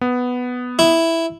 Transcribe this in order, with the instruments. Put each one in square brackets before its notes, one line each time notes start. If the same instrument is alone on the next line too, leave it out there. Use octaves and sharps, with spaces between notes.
[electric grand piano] B3
[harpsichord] E4